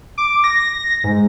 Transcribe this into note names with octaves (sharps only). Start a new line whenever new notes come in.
D6
A#6
G#2